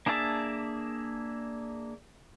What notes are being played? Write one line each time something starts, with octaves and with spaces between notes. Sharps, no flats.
A#3 D4 G#4 E5 A5